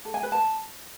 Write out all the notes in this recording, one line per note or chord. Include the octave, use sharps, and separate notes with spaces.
A4
G#5
B4
A5